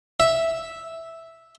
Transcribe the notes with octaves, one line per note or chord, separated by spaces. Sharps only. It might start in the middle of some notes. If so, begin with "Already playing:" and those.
E5